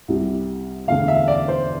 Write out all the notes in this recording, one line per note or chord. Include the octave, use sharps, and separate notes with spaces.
C2 C3 G3
E1 D2 D3 F5
E5
D5
C5